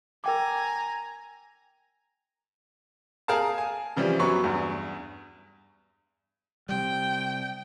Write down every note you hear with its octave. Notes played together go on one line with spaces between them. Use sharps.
A#4 G5 G#5 A#5 D6
G#4 A#4 F5 A5
G#5
C#3 E3 F3 G3
F#2 F#3 B3 C#6
E2 G2
C3 G3 G5